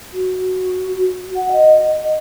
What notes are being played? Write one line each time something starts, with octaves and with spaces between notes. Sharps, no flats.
F#4
F#5
D#5